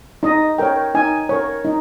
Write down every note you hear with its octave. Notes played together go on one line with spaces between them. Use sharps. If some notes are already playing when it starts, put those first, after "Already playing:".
D#4 D#5
A#4 C#5 G5
D#4 G#5
A#4 C#5
D#4